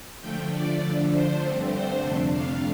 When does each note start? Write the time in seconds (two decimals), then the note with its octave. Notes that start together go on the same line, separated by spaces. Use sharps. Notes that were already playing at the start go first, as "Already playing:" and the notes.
0.21 D3 F3 A3 G5
0.52 D5
0.82 D3 F3 A3 D4
1.12 C5
1.42 G2 D3 A3 C4
1.72 C5
2.03 F2 C3 A3 D4
2.33 F5